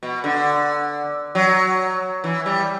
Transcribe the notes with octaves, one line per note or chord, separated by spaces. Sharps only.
B2
D3
F#3
E3
G3